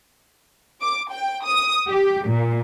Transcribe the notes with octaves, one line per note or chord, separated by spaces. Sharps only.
D6
G5
D#6
G4
A#2